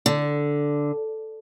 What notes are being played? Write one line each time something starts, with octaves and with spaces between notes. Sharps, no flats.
D3